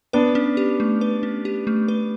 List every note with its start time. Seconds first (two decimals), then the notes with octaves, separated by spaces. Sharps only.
0.13 B3 D4 B4
0.35 C#4
0.57 G4
0.80 A3
1.01 B4
1.23 C#4
1.45 G4
1.67 A3
1.88 B4